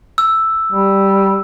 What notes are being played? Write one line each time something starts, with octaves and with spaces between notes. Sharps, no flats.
E6
G3